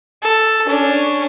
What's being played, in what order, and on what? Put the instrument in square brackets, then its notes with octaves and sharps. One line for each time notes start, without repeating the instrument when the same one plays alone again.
[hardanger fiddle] A4
C#4 D4